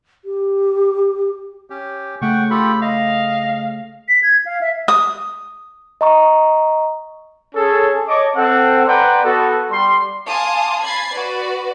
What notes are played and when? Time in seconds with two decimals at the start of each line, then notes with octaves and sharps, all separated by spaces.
0.25 G4
1.70 C#4 G4
2.22 C#3 A3 F#5 G5 C#6
2.51 F4 G4 A4 B5
2.82 D#5 F5
4.09 B6
4.23 G#6
4.46 F5
4.61 E5
4.88 D#6
6.01 D#5 A#5 C#6
7.55 C#4 G#4 A4
8.07 C#5 D#5 A5 C#6 D6
8.36 C4 A4 F#5
8.87 B4 D5 F#5 G5 A#5 C6
9.23 B3 F#4 A4
9.70 G3 C6
10.28 F5 G#5 A5 C6 D6 D#6
10.81 B5 G#6 A6 C7
11.13 F#4 B4 D5